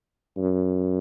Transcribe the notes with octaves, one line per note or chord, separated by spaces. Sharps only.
F#2